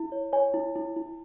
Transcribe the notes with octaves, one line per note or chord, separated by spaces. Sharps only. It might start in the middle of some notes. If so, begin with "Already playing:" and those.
Already playing: E4
C#5
C#5 G#5
E4
E4
E4